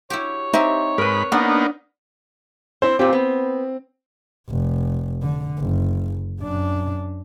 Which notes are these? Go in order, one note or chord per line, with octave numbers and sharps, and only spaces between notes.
E4 F#4 G4 C#5
C4 D#4 G4 C5 E5
G#2 A#4 B4 B5
A#3 B3 D4 D#4 F#5
C4 E4 C5
A#2 C4 F4 G4
B3
F1
D3
F#1
F#2 D4